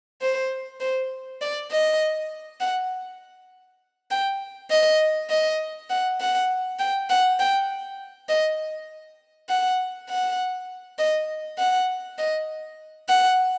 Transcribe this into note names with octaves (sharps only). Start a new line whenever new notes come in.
C5
C5
D5
D#5
F#5
G5
D#5
D#5
F#5
F#5
G5
F#5
G5
D#5
F#5
F#5
D#5
F#5
D#5
F#5